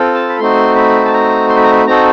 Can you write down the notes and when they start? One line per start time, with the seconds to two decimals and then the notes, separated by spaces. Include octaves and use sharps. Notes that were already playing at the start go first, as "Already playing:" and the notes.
Already playing: C4 F4 A4
0.15 A5
0.29 B5
0.39 A3 C4 D#4 F#4 C6
0.76 B5
1.05 A5
1.13 A#5
1.49 C6
1.56 B5
1.64 A#5
1.71 B5
1.87 C4 D#4 F#4 A4 A#5